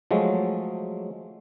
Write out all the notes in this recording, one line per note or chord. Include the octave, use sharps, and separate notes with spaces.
F3 F#3 G#3 A3